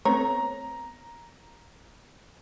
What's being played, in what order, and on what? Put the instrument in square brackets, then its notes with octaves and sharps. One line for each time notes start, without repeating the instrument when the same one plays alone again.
[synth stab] A3 B3 C4 [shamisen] C#5 [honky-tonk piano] A#5